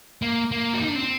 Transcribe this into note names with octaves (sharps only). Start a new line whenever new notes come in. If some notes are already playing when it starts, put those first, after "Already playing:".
A#3
A#3
F#4
D#4
D4
C4